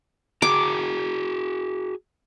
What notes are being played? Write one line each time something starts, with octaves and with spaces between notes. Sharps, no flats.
F#4 G#4 A#5 D6